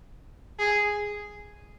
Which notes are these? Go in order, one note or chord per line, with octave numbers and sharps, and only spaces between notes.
G#4